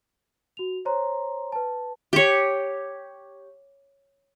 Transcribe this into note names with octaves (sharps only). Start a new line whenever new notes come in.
F#4 F7
C5 C#5 A#5 C6
B4 A5
G4 C#5